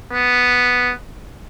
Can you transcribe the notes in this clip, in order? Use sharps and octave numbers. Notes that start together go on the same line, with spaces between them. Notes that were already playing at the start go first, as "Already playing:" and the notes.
B3